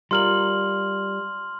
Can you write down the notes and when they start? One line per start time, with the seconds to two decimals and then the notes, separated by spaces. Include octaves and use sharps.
0.11 G3 F4 A#4 C6 F6 F#7